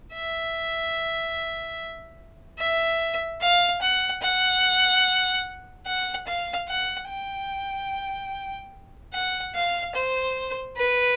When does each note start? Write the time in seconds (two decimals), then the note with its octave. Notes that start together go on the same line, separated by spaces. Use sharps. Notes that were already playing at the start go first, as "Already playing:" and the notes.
0.13 E5
2.58 E5
3.41 F5
3.81 F#5
4.22 F#5
5.86 F#5
6.27 F5
6.68 F#5
7.09 G5
9.13 F#5
9.55 F5
9.95 C5
10.77 B4